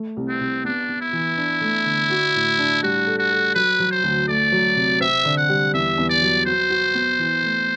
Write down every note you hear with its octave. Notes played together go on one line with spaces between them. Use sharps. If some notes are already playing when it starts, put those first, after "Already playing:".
Already playing: A3
C2
C4
C2
B3 D4
B3
E4
E3
D4
A3
D3
F#4
A2
D4
G3 F#4
A4
F#4
A4
F#3 B4
F#3
C5
D2
A3 D5
F#3
C3
C4 E5
D3
F#5
G3
E2 E5
E2
D5
F#3
F#4 C5
F#4
B3
E3
A3